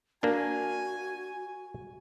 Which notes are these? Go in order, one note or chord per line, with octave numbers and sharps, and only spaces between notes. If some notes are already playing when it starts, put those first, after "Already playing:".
A#3 D4 F#4 G#5